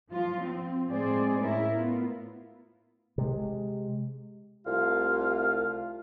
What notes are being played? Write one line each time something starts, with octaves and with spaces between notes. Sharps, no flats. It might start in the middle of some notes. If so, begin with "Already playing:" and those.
F3 F4
C4
A2 G#3 C4 G#4 C5 D5
A2 C#4 E4 A#4
B3 F4
C3 G#3
C2 A3 F4 F5